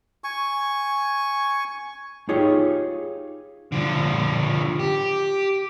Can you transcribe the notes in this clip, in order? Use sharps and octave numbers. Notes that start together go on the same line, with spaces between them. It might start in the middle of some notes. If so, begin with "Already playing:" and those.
G#5 C#6
D#4 F4 G4 G#4 C#5
D3 F3
G4